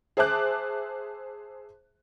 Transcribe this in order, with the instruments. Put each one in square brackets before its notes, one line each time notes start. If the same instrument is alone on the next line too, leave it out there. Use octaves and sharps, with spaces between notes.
[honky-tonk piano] G#4 C5 E5 A5 D6 F#6